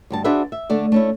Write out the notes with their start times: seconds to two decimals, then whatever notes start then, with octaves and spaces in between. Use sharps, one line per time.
0.10 D2 G2 A5
0.24 D4 F#4 G#4 B4 C5 E5
0.52 E5
0.70 D3 A3 D5
0.92 A3 C#4 E4